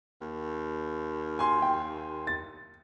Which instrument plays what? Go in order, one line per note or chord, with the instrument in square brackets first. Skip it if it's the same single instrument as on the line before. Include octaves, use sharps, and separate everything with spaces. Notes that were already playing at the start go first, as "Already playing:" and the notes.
[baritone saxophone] D#2
[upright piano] G#5 C6
[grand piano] G5
A6